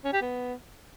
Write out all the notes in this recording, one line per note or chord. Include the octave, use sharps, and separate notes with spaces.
C#4
G4
B3